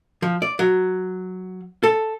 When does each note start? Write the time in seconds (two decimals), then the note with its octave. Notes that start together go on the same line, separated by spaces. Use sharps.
0.22 F3
0.42 D5
0.59 F#3
1.83 A4